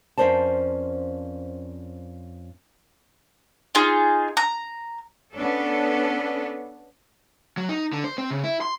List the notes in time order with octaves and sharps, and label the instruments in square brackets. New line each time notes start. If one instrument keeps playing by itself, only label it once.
[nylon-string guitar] F2 C#4 A#4 C5 D5 A5
[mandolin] D#4 F4 G#4
A#5
[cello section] B3 C#4 D4 A4
[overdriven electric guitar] F#3
D#4
D3
C5
C4
C#3
E4
C6